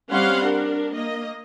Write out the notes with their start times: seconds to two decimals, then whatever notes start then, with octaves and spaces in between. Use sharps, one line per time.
0.11 G3 C4 C#4 F5 F#5 C6
0.43 D4 A#4
0.93 A#3 D#5